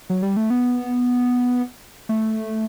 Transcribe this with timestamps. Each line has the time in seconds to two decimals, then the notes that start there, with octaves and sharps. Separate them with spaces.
0.10 F#3
0.22 G3
0.37 A3
0.50 B3
2.09 A3